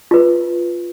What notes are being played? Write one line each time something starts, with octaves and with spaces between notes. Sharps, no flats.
F4 B4